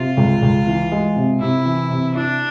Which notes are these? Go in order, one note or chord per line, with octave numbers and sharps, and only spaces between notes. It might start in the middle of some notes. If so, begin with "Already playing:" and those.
Already playing: C3 F4
C#2
C#2
E3
G#3
C3
C3 E4
E3
C3
D4 E4